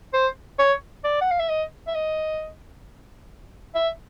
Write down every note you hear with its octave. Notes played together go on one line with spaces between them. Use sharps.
C5
C#5
D5
F#5
F5
E5
D#5
E5
D#5
E5